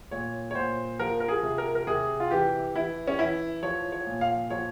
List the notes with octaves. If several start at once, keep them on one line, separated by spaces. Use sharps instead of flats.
A#2 C#5
C#5
A#2 C5
F3 A#4
A#4
G#4
C3
A#4
A#4
C3 G#4
F4
E3 G4
E3 E4
C#4
E3 E4
F3 C#5
C#5
A#2
F5
F3 C#5